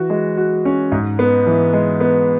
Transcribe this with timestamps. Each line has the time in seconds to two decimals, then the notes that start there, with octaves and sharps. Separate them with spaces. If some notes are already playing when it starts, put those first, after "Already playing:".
Already playing: E3 F#4
0.10 G#3
0.37 F#4
0.65 C#4
0.92 G#2
1.19 B3
1.47 E3
1.73 G#3
2.00 B3